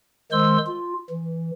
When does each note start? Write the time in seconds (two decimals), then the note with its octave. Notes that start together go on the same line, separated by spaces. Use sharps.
0.32 D#3 G#3 C5 C6 E6
0.66 F4
1.10 E3